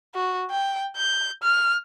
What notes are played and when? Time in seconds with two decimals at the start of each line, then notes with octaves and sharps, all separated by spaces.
0.15 F#4
0.50 G5
0.97 G6
1.43 F6